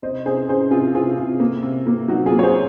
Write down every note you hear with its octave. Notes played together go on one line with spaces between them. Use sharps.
C3 C5 D#5
C3 G#4 C5
C#4 G#4 C5
C3 F4 G#4
C3 F4 G#4
C3 F4
A#3
C3
A#3
F#3 D#4 F#4
F4 G#4
A#3
C#5
G#4 C5